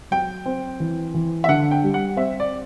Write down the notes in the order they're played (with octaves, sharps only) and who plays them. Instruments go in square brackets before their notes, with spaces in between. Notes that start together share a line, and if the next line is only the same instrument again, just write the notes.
[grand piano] F#3 [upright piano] G5
[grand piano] C4
E3
E3
[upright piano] E5
[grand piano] D3 [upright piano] F#5
[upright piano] G5
[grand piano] G3
[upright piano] F#5
[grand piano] C4 [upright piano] E5
[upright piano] D5